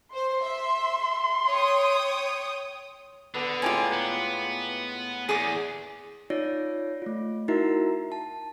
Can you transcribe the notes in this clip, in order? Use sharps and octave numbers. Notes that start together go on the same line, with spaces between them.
C5 C6
E5
C#5 G5 D#6
D3 B3 A4
A2 G#3 F4 G4 G#5 A#5
B3
E2 G#4 D6
D#4 F4 C#5 D5 A#6
A3 F4
D#4 E4 F#4 A#4 E5 A#5
A5